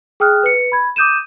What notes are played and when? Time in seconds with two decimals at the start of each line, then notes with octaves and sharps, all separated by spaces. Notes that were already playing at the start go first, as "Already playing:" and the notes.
0.20 G#4 G5 D#6 F6 F#6
0.43 B4 C#7
0.72 B5 G#6
0.96 D6 D#6 G6 D#7 E7